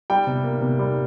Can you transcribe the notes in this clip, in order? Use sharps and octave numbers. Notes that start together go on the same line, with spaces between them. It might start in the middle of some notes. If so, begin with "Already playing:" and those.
G3 G5
C3
A#3
C3
G3